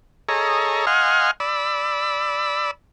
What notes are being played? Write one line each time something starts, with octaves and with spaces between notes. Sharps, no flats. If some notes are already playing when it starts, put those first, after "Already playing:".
G#4 A4 C#5 D#5 A#5
D#5 F5 F#5 G#5 C6 F6
D5 B5 E6